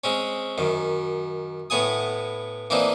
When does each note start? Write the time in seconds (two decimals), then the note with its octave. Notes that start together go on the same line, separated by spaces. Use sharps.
0.04 G#3 C4 C#4
0.58 F#2 D#3
1.70 A2 B3 F#5 G#5 D#6
2.70 E3 A#3 C4 D4 D#4